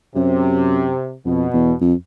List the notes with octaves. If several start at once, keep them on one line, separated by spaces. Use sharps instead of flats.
F#2 C3
F2 B2
E2
F2